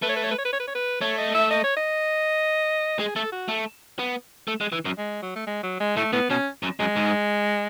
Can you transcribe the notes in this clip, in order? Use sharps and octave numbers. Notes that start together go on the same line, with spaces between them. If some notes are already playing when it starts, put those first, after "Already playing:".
A3 B4
C#5
B4
C#5
B4
C#5
B4
C#5
B4
C#5
B4
A3 C#5
D#5
E5
D#5
C#5
D#5
G#3 G#4
A3 A4
F#4
A3
B3
A3
G#3
E3
F#2
G#3
F#3
A3
G#3
F#3
G#3
A2 A3
A2 B3
B2 C#4
F#2
F#2 G#3
G#2